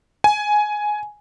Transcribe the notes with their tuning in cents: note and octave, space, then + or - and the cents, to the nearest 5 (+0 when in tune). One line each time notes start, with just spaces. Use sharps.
G#5 +10